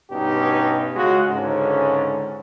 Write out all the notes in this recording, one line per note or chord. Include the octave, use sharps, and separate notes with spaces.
G2 B2 C#4 D#4 G4
C#3 G#3 F4 F#4
C#2 G#2 D3 C#4